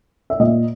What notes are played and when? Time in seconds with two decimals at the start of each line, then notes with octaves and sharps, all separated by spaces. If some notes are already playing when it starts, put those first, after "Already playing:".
0.30 E5
0.40 A#2 D#5